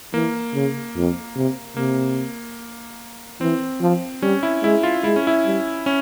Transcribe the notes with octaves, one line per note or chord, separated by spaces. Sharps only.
E3 A#3
C#3
F2
C3
C3 A#3
E3 C4
F3
G3 C#4
E4
G#3 E4
F4
G#3 E4
C#4
E4
G3
C#4